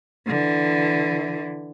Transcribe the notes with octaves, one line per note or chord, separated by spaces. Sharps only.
D3 E3